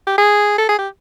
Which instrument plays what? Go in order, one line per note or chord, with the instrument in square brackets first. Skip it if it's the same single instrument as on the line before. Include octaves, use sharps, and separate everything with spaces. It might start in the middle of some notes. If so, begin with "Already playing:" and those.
[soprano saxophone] G4
G#4
A4
G#4
G4